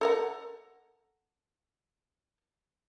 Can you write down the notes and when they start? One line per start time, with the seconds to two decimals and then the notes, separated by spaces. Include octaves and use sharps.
0.01 A4 A#4 F#5